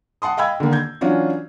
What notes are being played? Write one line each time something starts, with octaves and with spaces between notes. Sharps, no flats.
F#5 A5 C6 D#6
D#5 F5 G5 B5 E6 G#6
D3 D#3 A#3
G6 G#6
E3 F#3 C#4 D4 F4 F#4